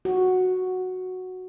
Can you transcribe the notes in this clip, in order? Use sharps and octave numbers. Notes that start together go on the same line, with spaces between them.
F#4